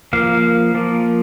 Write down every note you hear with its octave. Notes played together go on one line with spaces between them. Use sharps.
F3 A#3 F5
F3 A#3